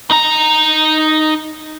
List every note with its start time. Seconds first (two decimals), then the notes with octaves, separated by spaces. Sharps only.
0.11 D#4 A#5